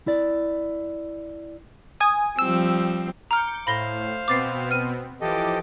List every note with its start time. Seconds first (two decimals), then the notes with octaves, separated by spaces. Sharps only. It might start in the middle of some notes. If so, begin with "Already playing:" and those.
0.07 E4 D5
2.00 G#5 D#6
2.39 F3 G3 C4 E6
3.31 A#5 D6 F6 G6 C#7
3.67 A2 C5 F5 B5 A#6 G7
4.28 B2 B3 C4 D6 A6 C7
4.71 F6 D#7
5.21 E3 F3 G4 A4 D#5 D6